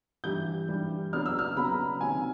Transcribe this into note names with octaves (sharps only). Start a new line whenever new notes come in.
G2 E3 G3 G6
G2 E3 G3
C#3 F#3 B3 D4 F6
E6
F6
C#3 F#3 B3 D4 B5
A#5
B5
C3 D#3 F#3 G#5